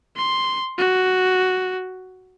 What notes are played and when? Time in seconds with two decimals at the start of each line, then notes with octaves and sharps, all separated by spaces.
0.17 C6
0.78 F#4